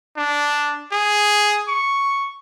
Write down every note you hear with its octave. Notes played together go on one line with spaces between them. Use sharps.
D4
G#4
C#6